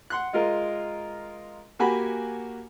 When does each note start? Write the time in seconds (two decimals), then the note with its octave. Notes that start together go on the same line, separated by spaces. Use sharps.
0.10 F#5 C6 F#6
0.33 G#3 F4 A#4 D#5
1.79 A#3 F#4 G4 G#5 B5